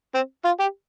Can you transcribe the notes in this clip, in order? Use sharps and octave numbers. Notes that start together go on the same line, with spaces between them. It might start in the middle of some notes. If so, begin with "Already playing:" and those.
C4
F4
G4